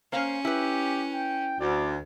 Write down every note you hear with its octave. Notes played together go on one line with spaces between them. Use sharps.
A#3 C#4 C5 F5
E4 G4 B4
G5
D2 D5